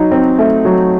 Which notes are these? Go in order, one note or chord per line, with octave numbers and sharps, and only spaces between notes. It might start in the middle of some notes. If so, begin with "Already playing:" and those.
Already playing: F#3 D#4
C4
A3
F#3